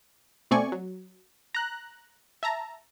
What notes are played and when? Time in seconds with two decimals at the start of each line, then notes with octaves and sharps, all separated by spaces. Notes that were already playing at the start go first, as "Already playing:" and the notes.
0.51 B2 A3 C4 D5 G#5 C#6
0.72 F#3
1.55 A#5 F#6
2.43 E5 A5 A#5